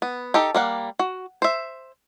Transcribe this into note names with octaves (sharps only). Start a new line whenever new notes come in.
B3
D#4 G4 A4
G3 A#3 F#5
F#4
C5 E5